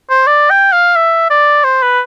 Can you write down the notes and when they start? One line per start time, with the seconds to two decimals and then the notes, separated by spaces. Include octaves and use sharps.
0.10 C5
0.27 D5
0.50 G5
0.72 F5
0.96 E5
1.30 D5
1.64 C5
1.82 B4